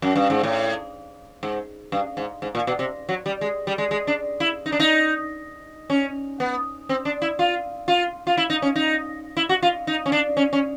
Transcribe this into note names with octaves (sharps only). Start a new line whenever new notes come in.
F#2
G2
G#2
A2
G#2
G2
G#2
G#2
A#2
B2
C3
F#3
G3
G#3
G3
G#3
G#3
D4
E4
D#4
D4
D#4
C#4
B3
C4
D4
E4
F4
F4
F4
E4
D#4
C#4
D#4
E4
F#4
F4
D#4
C#4
D4
C#4
C#4